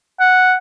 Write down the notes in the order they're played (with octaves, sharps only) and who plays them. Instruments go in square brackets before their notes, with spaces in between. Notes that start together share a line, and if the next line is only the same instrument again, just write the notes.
[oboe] F#5